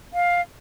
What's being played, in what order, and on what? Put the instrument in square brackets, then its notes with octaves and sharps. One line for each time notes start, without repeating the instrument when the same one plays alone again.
[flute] F5